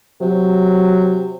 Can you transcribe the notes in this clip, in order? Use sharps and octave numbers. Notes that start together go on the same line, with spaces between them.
C3 F#3